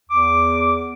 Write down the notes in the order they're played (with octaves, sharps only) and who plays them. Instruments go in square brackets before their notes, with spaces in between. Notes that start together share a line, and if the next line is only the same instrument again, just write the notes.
[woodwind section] E2 D6